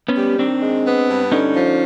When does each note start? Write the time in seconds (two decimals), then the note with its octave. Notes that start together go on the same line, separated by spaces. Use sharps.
0.08 B3 C#4
0.16 G3
0.39 D#3 C4 D4
0.62 G#3
0.85 B3
1.09 G2
1.32 D3 C#4 D#4
1.55 F3